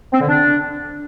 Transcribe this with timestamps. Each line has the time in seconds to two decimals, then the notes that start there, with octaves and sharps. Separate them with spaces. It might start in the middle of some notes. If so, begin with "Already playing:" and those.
0.13 C4
0.21 D3
0.28 D4